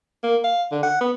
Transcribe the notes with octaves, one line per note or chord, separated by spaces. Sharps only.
A#3
F5
D3
F#5
B3